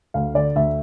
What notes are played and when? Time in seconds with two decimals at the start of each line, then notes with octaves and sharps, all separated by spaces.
0.14 D2 F5
0.34 D3 D5
0.56 D2 E5